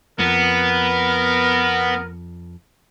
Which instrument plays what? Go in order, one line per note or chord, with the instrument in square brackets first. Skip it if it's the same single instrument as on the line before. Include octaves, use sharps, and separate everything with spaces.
[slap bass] F2 [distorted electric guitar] B3 [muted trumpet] A#4